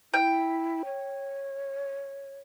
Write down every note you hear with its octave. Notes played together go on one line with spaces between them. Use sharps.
E4 G5
C#5